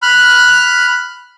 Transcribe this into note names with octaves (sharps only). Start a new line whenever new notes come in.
B5 F6 F#6